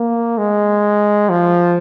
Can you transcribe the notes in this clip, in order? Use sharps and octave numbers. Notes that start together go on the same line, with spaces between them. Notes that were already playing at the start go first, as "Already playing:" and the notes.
Already playing: A#3
G#3
F3